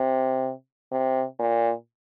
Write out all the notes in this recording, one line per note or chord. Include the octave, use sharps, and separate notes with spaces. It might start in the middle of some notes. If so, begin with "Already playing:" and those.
Already playing: C3
C3
A#2